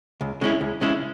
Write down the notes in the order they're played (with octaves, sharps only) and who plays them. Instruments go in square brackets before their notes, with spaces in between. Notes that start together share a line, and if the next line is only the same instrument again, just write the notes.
[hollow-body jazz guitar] C#2
C#3 G#3 C#4 E4
C#2
C#3 G#3 C#4 E4